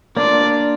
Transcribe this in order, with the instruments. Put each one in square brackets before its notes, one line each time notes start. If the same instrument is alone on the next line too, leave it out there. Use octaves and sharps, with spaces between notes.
[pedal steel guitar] A#3 D4 F4 [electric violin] D5